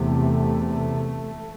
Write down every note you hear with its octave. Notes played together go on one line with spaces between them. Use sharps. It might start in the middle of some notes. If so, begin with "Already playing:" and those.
Already playing: E2 C3 A3